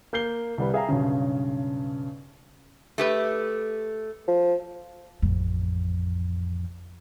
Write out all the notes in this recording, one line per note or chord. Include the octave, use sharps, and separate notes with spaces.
A#3 G6 C7 G7
C2 G3 B4
G#4 E5 F5 G5 A#5
B1 G2 C#3
A3 G4 B4
F3
A1 F2